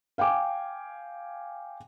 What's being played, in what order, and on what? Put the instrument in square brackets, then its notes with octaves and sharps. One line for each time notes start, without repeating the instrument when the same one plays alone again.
[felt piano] F5 G5 G#5 D6